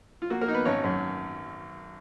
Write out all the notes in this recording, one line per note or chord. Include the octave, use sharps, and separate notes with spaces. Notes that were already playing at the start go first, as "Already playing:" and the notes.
F4
A#3 F#4
A#3 A#4
D#4
B3 B4
G#1 C#4 C#5
F#2